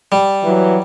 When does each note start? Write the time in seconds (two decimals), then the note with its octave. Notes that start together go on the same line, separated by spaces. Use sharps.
0.12 G3
0.44 E3 F#3